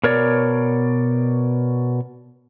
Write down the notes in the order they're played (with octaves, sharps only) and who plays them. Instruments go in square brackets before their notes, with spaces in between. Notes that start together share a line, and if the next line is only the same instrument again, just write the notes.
[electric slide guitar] B2 A#4 C#5 D5